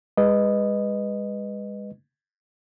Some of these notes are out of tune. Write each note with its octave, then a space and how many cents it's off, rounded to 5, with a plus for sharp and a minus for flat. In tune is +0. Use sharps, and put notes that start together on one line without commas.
G#3 -30 B4 +0 D#5 -10